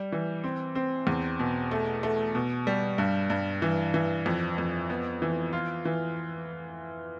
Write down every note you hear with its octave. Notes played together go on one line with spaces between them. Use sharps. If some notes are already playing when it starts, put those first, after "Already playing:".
Already playing: G3
E3
C4
C4
E2
B2
A3
A3
B2
G3
G2
G2
E3
E3
F2
F2
B3
E3
F4
E3